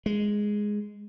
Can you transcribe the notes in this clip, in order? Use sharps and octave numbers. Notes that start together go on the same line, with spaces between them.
G#3